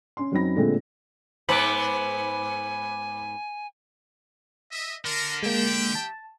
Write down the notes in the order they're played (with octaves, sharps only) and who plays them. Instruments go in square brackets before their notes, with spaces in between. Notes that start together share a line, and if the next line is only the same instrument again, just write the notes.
[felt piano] C#4 C6
F#2 F#3 C4 D#4 B5 A#6
A#2 D3 G#3 A3 C4 F4
[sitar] G#2 B3 C5 [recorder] G#5 [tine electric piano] B5 D6
[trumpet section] D#5 E5
[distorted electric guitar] D3 [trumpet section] A#4
[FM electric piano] G#3 A#3 [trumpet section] G4 E5 G5
[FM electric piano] A5